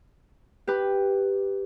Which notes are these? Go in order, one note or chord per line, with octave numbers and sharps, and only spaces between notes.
G4 B4